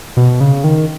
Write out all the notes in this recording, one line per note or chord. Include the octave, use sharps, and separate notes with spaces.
B2
C#3
D#3